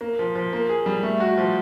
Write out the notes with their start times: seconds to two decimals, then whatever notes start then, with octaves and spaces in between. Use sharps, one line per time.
0.01 A#3
0.19 F3
0.35 F3
0.53 A#3
0.69 G#4
0.86 G3
1.03 A3
1.20 F#4
1.38 F3